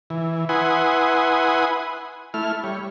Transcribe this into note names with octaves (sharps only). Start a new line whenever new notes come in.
E3
E4 B4 F#5 G#5 C6 D#6
A3 E4 F6
G3 C#5